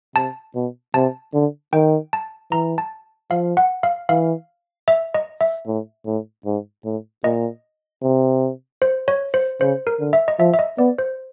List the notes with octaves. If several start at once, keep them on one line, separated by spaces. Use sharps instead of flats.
C3 A5
B2
C3 A5
D3
D#3 G5
A5
E3 A#5
A5
F3 F5
F#5
F5
E3 F5
E5
D#5
E5
A2
A2
G#2
A2
A#2 D#5
C3
C5
C#5
C5
C#3 C5
A#4
D3
E5
D#5
F3 E5
E5
D#5
B3 D5
C5